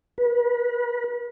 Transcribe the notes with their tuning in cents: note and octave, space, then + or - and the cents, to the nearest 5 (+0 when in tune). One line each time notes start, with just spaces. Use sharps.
B4 -35